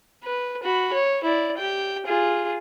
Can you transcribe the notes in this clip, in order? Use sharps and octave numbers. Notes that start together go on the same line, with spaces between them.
B4
F#4 B5
C#5
E4 D5
G4 G5
F4 G#4